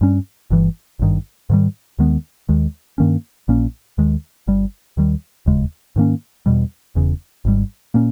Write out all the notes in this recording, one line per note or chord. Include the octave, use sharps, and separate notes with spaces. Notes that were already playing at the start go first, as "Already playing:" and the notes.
G2 G3 C#4
G1 G2 E3
G#1 G2 D#3
G#2 D#3 G3
D#2 D#3 G#3 B3
D#2 D#3 G#3
G2 D#3 A#3 C#4
A#1 A#2 A#3 C#4
D#2 D#3 G#3
G1 G2 G3
D#2 D#3 G3
E1 D#2 C#3 G#3
G#2 D#3 A#3 C#4
E2 B2 G3
E1 E2 C#3
G#1 G#2 G3
A#2 A#3 C#4